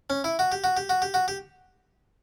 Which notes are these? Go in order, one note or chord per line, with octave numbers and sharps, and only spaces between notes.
C#4
E4
F#4
G4
F#4
G4
F#4
G4
F#4
G4